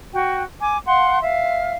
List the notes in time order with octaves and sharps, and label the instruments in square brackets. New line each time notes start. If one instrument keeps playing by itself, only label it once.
[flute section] F#4 G5
G#5 D6
F5 F#5 C6
E5 F5